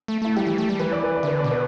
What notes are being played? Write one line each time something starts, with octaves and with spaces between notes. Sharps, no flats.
A3
A3 E4
G3 G4
E3
A3
G3
E3 B4
D5
B4
D5
D3 B4
D5
B2
B4